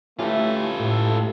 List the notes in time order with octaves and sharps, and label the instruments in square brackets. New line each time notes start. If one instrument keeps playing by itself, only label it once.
[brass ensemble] A3 [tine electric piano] C#4 E4 G4 [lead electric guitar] F4 B4
[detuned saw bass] A2 [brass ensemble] A4